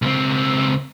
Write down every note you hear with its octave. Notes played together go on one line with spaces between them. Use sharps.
C#2 C4